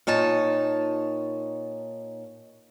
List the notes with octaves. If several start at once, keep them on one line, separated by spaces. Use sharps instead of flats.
A#2 D#4 C#5 A5